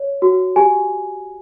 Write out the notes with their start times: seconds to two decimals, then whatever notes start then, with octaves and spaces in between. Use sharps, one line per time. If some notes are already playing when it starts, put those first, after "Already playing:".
Already playing: C#5
0.22 F#4
0.56 G4 G#5